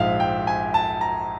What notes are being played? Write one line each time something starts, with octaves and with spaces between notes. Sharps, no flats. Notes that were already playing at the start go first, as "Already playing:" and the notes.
Already playing: A#1 G#2 F3 E5 F5
G5
G#5
A5
A#5